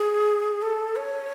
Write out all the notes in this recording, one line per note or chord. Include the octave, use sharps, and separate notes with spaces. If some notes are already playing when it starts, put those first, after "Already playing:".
Already playing: G#4
A4
C#5